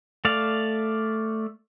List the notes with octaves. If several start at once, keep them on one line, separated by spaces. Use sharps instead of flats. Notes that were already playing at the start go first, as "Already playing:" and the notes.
A3 D5 F5